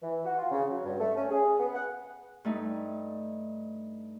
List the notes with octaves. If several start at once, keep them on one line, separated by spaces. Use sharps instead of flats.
E3
F#4
F4
C#3
F#3
G2
A3
C#4
G#4
B3
F#5
G2 A3 D#4